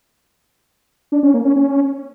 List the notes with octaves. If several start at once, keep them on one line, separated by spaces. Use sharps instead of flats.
D4
C#4
A#3
C#4
C#4